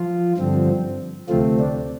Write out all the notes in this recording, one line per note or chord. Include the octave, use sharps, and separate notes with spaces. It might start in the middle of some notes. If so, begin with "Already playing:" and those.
Already playing: F3 F4
G2 D3 F3 C4
D2 C3 F3 A3 C4 F4
D4